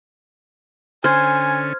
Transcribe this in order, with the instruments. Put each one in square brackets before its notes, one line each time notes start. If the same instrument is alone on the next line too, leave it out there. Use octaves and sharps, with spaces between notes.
[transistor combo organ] D3 C#4 [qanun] C5 [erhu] G#5 [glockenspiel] F6 G#6